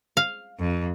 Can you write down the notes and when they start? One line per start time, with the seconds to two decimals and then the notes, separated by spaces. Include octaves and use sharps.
0.17 F5
0.60 F2